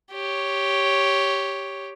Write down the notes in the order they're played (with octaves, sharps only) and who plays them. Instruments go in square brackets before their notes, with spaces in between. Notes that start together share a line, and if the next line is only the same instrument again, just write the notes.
[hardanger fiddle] G4 C#5